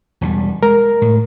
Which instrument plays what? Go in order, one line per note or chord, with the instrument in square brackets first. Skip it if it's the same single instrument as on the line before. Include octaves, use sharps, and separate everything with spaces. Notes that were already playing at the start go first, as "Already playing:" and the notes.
[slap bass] E1 E2 G3
[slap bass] G#3 [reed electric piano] A#4
[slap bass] A2